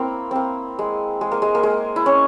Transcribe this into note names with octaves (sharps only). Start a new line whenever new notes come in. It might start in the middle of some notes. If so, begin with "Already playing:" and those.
Already playing: A#3 C4 E4
A#3 C4
G#3
G#3
A#3
G#3
A#3
G#3
E4
C#4